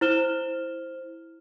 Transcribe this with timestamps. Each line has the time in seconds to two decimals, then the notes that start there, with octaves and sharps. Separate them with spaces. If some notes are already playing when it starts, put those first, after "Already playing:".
0.01 E4 C5 F6 E7 G7